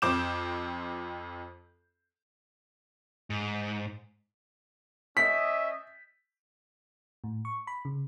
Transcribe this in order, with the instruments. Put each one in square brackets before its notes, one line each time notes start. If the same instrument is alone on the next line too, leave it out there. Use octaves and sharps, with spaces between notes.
[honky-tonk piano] F2 C4 D6 G6 E7
[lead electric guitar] G#2
[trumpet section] C#4 D#5 E5 [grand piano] B6
[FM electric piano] A2
C#6
B5
C#3